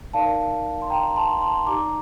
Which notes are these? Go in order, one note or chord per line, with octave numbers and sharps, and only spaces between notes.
D#4 A#4 D5 F5 A5
C6
G5 A#5
A5 C6
A5 C6
D#4 G4 D5 A#5 D6